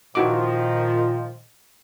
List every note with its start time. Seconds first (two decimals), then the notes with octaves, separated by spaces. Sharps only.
0.15 A#2 D#3 F3 E4 F#4 D6